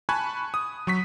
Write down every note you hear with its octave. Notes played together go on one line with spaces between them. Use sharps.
G#5 A5 B5 C#6 F#6 G#6
D#6
F#3 C#6 B6